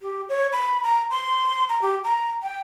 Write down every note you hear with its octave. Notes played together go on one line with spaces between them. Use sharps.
G4
C#5
B5
A#5
C6
A#5
G4
A#5
G5